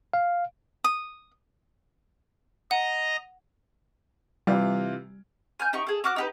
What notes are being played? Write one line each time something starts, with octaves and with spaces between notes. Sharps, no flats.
F5
D#6
D#5 F#5 A#5
C3 E3 G3 F4
G#5 F6 G6
D#4 G4 G5 C#6
G#4 A4
F#4 D6 F6 F#6
D#4 G4 B4